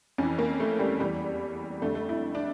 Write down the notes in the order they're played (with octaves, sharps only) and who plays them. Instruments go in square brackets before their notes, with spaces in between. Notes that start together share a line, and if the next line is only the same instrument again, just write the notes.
[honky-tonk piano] F2 E3 C#4
A#3
A3
G3
E2 E3 G3
F2 D3 A3
A3
E4
D4